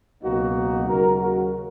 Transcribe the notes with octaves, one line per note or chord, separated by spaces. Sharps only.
C#2 B2 F#3 A#3 D#4 F#4
D#2 C#3 F#3 F#4 A#4
F#4 A#4